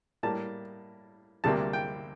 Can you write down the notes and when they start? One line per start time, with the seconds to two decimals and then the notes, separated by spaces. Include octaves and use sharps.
0.23 A2 G3 A#3 A5
1.44 D2 C3 G3 A#3 A5
1.73 G5